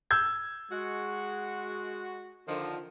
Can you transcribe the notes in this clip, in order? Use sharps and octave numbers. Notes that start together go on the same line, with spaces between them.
E6 G6 G#6
G#3 F#4
D3 D#3 F3